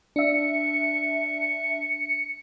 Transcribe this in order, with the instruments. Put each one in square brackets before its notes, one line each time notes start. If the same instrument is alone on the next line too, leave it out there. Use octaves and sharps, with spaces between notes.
[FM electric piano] D4 E5 [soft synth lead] C#7